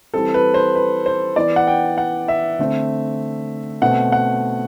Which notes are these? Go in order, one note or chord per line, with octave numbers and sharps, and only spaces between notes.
E3 G3 C4 A4
B4
C5
B4
C5
E3 B3 D5
F#5
G5
F#5
E5
D3 A3 C4
B2 A3 C4 F#5
F#5